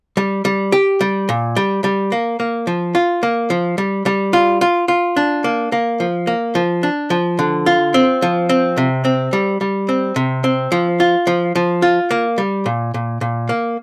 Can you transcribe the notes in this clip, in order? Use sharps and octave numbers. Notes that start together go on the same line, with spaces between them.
G3
G3
G4
G3
A#2
G3
G3
A#3
A#3
F3
F4
A#3
F3
G3
G3
F4
F4
F4
D4
A#3
A#3
F3
A#3
F3
D4
F3
D3
F4
C4
F3
C4
C3
C4
G3
G3
C4
C3
C4
F3
F4
F3
F3
F4
A#3
G3
A#2
A#2
A#2
A#3